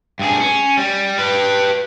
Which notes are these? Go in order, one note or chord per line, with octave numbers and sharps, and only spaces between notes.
G2 G#4
C#4
G3
G4 B4